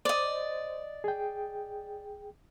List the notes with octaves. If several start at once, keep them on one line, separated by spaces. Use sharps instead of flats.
C5 D5 D#5
G#4 G5